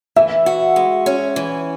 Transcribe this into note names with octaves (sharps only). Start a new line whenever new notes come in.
E3 E5
F#4
G#3
C#4
E3